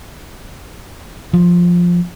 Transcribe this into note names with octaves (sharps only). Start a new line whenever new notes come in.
F3